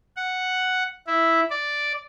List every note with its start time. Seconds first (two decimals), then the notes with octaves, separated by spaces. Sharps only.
0.16 F#5
1.07 E4
1.50 D5